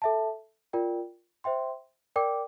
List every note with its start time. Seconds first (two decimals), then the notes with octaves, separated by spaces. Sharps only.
0.02 A4 E5 A5
0.73 F4 A#4 D5 G5
1.44 C5 E5 G5 C6
2.16 A#4 D5 G5 D6